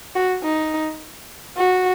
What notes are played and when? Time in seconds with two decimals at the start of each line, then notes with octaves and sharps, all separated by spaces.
0.15 F#4
0.44 D#4
1.57 F#4